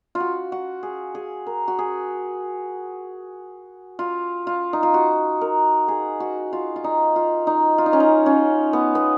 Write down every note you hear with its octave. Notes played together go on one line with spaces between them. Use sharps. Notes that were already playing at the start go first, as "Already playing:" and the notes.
F4
F#4
F#4
G#4
G#4
A#4
F#4
G#4
F4
F4
D#4
F4
F#4
A#4
G#4
F#4
F4
F4
D#4
F4
D#4
F4
D#4
C#4
D#4
C#4
B3
B3